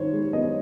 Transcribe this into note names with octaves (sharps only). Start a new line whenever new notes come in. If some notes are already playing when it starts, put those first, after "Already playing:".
Already playing: G2 D#3 C5 C#5
G#3
B3 D#5